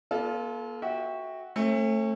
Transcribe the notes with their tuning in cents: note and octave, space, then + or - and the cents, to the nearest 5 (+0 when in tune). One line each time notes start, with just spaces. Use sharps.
A#3 +45 F4 +0 A4 -30
F#4 +0 E5 -25 G5 +15
A3 +10 C#4 -45